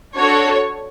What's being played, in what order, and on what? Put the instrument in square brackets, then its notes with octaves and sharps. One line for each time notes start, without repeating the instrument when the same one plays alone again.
[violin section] D4 F#4 A4 C#5